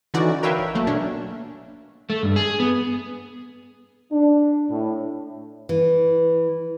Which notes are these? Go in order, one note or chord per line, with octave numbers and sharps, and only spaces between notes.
D3 E3 C#4 D#4 F#4 D5
A#4 B4 C#5 E5 F5 G5
A1
F#3 A3 A#3
B2 C#4 D4
A3
G2
G#4
B3
D4
A2
E3